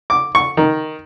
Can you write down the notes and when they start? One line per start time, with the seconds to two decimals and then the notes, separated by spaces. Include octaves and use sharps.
0.10 D6
0.35 C#6
0.57 D#3